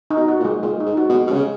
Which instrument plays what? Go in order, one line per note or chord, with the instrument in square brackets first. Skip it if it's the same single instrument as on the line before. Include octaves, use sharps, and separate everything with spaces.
[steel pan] D#4
[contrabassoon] B2
[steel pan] F#4
[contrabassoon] A#2
[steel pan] G#3
[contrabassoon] A#2 [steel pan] G#3
[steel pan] D#4
[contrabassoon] G#2
[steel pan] F#4
[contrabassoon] B2
[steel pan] G#3
[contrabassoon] B2
[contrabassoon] C#3 [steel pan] G#3